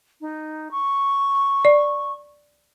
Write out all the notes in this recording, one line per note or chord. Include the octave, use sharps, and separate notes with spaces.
D#4
C#6
D5